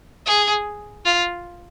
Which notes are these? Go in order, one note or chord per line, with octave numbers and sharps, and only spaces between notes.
G#4
F4